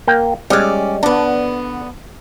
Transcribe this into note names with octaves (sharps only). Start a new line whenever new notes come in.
A#3 G5
G3 G#3 C#4 D5
D3 B3 D4